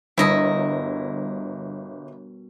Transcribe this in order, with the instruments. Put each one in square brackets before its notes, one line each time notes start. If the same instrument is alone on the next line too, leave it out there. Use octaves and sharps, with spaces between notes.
[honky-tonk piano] G1 [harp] B2 G3 A#4 [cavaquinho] E4 D#5 B5